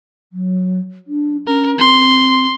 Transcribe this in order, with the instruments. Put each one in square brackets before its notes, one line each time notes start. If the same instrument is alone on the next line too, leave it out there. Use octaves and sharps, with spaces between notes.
[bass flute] F#3
D4
[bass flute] C#4 [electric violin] A#4
[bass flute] C4 [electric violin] C6